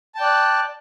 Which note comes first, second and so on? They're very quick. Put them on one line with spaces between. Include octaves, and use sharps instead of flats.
A5 G5 D5 F#6